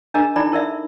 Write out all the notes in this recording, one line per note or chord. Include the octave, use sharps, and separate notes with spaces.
D4 G#4 A#4 D#5 A#5
D#4 E4 A4 D5 B5
E4 A#4 D5 E5